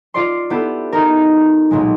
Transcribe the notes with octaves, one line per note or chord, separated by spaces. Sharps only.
F4 D5 C6
B3 E4 G4 A4
D#4 A#4
B1 A#2 G#3